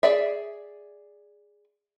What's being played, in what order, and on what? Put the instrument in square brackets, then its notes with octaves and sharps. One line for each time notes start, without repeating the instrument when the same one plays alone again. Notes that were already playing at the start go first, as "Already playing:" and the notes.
[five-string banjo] G#4 D5 E5